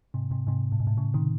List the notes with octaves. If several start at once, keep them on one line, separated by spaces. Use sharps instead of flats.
G#2 C3
G#2 C3
G#2 C3
A2
G#2
A2
A2 C#3
C3 D#3